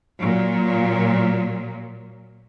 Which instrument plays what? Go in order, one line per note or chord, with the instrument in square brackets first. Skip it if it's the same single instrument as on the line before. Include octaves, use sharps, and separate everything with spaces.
[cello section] A#2 F#3